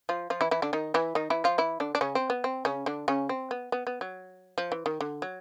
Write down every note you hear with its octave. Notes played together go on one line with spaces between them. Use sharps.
F3 F4
F3 F4
E3 E4
E3 E4
D3 D4
D#3 D#4
E3 E4
D#3 D#4
E3 E4
F3 F4
E3 E4
D3 D4
D4
C#3 C#4
C4
B3
C4
C#3 C#4
D3 D4
C#3 C#4
C4
B3
B3
B3
F#3
F3
E3
D#3
D3
F#3